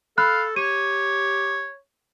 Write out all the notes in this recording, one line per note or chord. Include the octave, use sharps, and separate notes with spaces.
A4 F5 B5 F6 F#6
G4 C#5 D#7